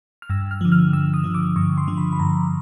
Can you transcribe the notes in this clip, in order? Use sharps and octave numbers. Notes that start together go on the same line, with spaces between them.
F6
G2 E6
F6
D3 F3
F6
G2 E6
D#6
D3 F3
D6
G2 C#6
C6
D3 F3
B5
B5
G2 A#5